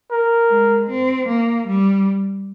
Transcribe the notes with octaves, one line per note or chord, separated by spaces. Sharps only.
A#4
G#3
C4
A#3
G3